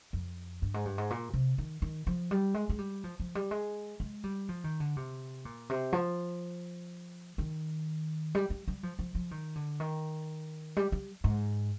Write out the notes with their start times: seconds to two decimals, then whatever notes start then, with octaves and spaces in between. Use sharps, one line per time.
0.13 F2
0.62 G2
0.74 G#2
0.85 G2
0.98 G#2
1.10 A#2
1.34 C3
1.58 D#3
1.82 D#3
2.07 F3
2.31 G3
2.54 G#3
2.69 G#3
2.79 G3
3.04 F3
3.20 F3
3.35 G3
3.51 G#3
4.00 G#3
4.24 G3
4.49 F3
4.64 D#3
4.80 D3
4.96 C3
5.45 A#2
5.70 C3
5.93 F3
7.38 D#3
8.35 G3
8.50 G3
8.68 G3
8.83 F3
8.99 F3
9.15 F3
9.31 D#3
9.56 D3
9.80 D#3
10.77 G3
10.92 G3
11.24 G#2